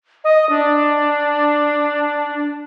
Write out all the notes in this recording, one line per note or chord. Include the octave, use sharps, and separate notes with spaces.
D#5
D4